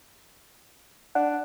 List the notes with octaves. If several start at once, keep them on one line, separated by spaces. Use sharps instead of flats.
D4 F#5